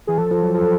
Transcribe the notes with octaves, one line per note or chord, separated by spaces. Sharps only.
E3 G#4
F3 A4
F3
F#3
F3